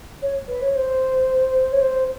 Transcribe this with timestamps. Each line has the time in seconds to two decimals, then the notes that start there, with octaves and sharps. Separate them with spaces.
0.22 C#5
0.48 B4
0.61 C#5
0.75 C5
1.72 C#5
1.81 C5